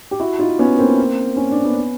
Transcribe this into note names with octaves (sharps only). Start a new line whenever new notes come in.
G4
E4 F#4
D#4 F4
B3 C#4
A#3 C4
C#4
D4
B3 C#4